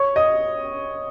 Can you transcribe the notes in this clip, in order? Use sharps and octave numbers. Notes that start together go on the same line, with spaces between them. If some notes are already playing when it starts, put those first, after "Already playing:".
Already playing: C#5 C#6
D#5 D#6